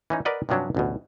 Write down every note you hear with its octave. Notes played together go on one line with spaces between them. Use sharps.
E3 C#4 D#4
A#4 B4 D5 D#5 F#5
G2 C3 F3 F#3 C#4 D4
A1 D2 B2